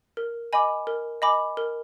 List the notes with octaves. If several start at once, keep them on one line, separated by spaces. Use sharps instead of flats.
A#4
D#5 G#5 B5 D6
A#4
D#5 G#5 B5 D6
A#4